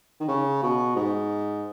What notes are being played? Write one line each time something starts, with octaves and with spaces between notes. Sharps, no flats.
D#3
C#3
B2
G#2